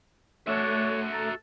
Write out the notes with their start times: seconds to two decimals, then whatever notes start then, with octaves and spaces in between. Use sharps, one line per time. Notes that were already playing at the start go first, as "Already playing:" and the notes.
0.48 A3 D4 F#4 C#5 E5
1.12 A4 A#5